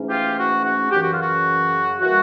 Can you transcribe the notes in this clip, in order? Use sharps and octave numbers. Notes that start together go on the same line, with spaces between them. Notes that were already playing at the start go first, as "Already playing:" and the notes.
Already playing: G#2 E3 A3 C#4
F4 G4
F#4
F#4
F#2 C#3 E3 G4
F#4
F4
F#4
E3 G3 A#3 F#4